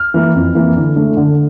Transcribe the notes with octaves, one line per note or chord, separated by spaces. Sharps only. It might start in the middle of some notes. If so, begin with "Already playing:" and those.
Already playing: F6
E3 A#3
F2
E3 A#3
D3
A3 D4
D3